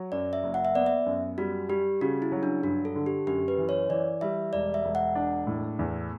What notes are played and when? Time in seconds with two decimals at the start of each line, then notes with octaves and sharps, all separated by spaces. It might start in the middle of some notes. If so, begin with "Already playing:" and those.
Already playing: F#3
0.12 F#2 D5
0.33 E5
0.44 F#1
0.54 F#5
0.65 E5
0.75 B3 D5
0.86 E5
1.06 F#2
1.38 G3 F#4
1.69 G3 G4
2.01 C#3 F#4
2.22 E4
2.32 F#3
2.43 D4
2.63 G2 F#4
2.85 A4
2.96 D3
3.06 G4
3.27 F#2 G4
3.48 B4
3.58 E3
3.69 C#5
3.89 E3 D5
4.21 G3 E5
4.53 E1 D5
4.74 E5
4.85 E1
4.95 F#5
5.15 D4
5.47 A2
5.79 E2